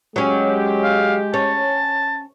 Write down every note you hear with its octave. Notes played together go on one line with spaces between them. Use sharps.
F#3 G#3 C#4 G4
F5
C#4 A5